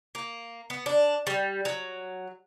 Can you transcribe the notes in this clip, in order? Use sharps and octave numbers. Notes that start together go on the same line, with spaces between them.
A#3
B3
D4
G3
F#3